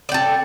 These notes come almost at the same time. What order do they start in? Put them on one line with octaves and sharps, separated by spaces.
D5 G5 A4